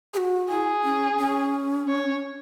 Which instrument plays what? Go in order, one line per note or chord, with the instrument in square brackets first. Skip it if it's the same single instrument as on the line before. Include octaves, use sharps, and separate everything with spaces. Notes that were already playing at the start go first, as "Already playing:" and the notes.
[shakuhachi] G#4
F#4
[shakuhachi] E4 [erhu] G#4
[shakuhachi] C#4
C#4
[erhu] C#5